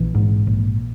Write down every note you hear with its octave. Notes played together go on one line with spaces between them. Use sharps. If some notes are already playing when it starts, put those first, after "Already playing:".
Already playing: A#1 E3
G#2
A#1